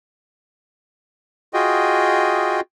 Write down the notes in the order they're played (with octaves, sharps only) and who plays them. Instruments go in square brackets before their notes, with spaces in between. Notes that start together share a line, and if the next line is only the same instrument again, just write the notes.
[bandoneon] F4 F#4 G#4 D#5 G5